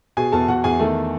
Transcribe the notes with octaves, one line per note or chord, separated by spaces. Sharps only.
B2 G#4 G#5
E2 A4 A5
E2 F#4 F#5
E2 G#4 G#5
D#3 A3 A4